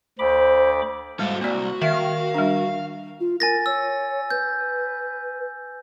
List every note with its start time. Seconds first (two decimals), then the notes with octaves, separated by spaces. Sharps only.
0.19 D2 C5 B5 D6
1.19 G#2 G3 G#3 F#4 A4 F5
1.41 C2 A#3 F#4 D5
1.82 D#3 E5 F5
2.34 G3 D4
3.20 F4
3.40 A#4 G#5 A6 A#6
3.66 C#5 E6
4.30 B4 G6